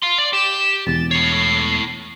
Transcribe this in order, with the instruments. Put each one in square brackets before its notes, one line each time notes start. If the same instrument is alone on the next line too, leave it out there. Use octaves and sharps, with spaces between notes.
[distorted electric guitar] F5 C6
D5
[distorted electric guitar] G4 [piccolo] E7
[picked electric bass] E1 E2 [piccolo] A6
[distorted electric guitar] A2 C#5 [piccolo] C7